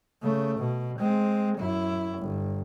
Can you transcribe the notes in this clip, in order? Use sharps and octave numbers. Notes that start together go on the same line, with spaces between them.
C#3 A3
B2
G#3 C4
F#2 E4
G1